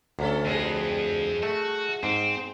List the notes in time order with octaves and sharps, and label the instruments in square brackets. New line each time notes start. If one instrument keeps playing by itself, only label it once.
[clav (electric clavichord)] D2 [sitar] A3 C#4 A4
[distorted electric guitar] F2 [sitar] G3 G#3 G#4
[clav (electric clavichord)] A3 [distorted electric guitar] F#4
[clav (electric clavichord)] G#2 [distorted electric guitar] C4